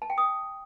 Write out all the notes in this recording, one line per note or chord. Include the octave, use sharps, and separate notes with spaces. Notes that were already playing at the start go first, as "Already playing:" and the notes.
A5
G5
D#6